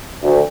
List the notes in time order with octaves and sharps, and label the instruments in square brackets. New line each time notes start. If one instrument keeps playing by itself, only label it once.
[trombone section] D2